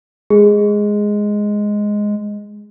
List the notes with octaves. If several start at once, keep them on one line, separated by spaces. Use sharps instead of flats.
G#3 G#4